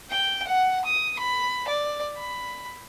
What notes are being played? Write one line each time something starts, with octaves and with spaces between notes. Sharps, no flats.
G5
F#5
D#6
B5
D5
B5